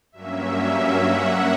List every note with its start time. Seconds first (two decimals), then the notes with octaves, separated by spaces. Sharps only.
0.12 G2 F#3 A#3 C#4 E5
0.94 F#5